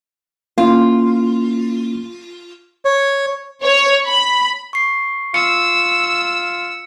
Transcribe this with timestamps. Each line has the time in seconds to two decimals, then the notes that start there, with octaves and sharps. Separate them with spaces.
0.58 A#3 C#4 E4 F4
2.85 C#5
3.62 C#5
4.06 B5
4.73 C#6 C7
5.34 F4 E6 C#7